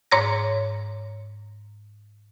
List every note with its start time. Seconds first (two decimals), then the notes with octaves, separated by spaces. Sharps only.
0.11 G#2 C#5 A#5 A#6